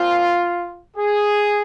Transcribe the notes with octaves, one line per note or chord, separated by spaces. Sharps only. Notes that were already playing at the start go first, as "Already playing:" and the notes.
Already playing: A#2 F3 C4 F4
G#4